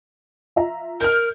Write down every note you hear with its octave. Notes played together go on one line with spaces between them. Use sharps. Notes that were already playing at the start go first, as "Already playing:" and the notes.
F4 E5 A#5
A#4 F6 G6